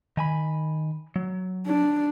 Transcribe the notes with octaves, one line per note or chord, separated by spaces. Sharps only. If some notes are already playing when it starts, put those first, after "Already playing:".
D#3 G#5 B5
F#3
D4